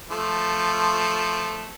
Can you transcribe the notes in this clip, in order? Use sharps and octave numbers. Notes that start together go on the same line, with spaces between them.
F3 A3